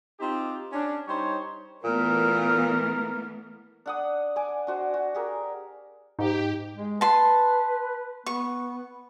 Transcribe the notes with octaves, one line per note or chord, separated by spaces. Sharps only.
C4 D#4 F4 G4
C#4 D4
G3 D#4 C5 C#5
A#2 E3 A3 B3 A#4
D4 F#5 D#6
D5 G#5 D6
D4 F#4 C5
F#4
G4 G#4 A#4
G#2 D#4 G4
G#3
B4 A5 C6
B3 C#6